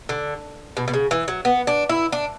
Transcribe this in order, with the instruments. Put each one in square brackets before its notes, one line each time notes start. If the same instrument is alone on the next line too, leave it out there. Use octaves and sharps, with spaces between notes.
[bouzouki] D3
B2
B2
C#3
E3
F#3
B3
D4
E4
D4